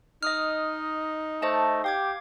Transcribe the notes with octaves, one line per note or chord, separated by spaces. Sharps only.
D#4 D#5 D#6 F6
A3 C5 D#5 A5
G4 F5 D6 G#6